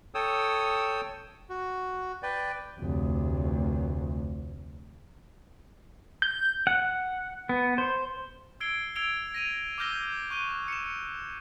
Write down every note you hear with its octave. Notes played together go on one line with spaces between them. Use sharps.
A4 C#5 G5 D#6 E6
F#4
B4 D5 G5
F1 D2
G6
F#5
B3
C5
E6 G#6 C7 D7 G7
E6 G#6 D7 F7 G7
A#6 D#7 F7
D6 E6 F6 G6 A#6 G7
C#6 F#6 D#7 G7
C#7 E7